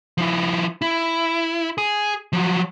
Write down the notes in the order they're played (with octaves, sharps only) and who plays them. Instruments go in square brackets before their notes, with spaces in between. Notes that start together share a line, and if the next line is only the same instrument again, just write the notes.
[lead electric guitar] F3 E4
E4
G#4
F3 F#3